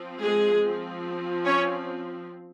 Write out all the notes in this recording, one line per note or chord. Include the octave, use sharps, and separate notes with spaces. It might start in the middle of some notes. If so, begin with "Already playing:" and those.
Already playing: F3 C4
G#3 G#4
F3 C4
C#4 C#5